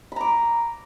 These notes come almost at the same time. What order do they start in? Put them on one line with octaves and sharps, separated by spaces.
B5 A#5 D6